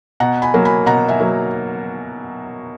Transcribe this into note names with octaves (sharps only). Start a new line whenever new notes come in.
B2 F#5 A#5
G#5 B5
F#3 A#3
G#5 B5
B2 F#5 A#5
E5 G#5
F#3 A#3